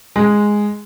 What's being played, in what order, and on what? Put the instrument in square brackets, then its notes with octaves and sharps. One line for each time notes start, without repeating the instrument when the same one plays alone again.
[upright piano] G#3